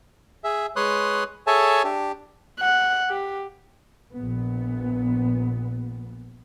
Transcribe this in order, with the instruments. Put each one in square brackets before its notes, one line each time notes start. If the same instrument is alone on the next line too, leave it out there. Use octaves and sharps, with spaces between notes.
[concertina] G#4 E5
G#3 B4 C#5 C6 D#6 F#6
G#4 A4 C#5 E5 G#5 A5
D4 G4
[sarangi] F#5
G4
[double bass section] A#1 A#2 B3